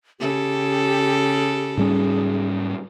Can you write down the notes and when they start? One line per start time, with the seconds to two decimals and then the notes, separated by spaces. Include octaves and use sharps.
0.20 C#3 G4 A4
1.77 G#2 G3 C#4 G#4